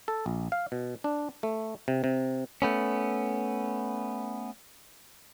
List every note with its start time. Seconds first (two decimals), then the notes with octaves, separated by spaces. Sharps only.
0.08 A4
0.26 A#1
0.52 F5
0.72 B2
1.04 D4
1.43 A3
1.88 C3
2.04 C3
2.62 A3 B3 C#4